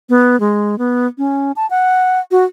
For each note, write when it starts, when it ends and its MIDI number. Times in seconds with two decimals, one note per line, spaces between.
0.09 0.38 59
0.40 0.78 56
0.78 1.07 59
1.18 1.52 61
1.56 1.68 81
1.70 2.20 78
2.31 2.44 66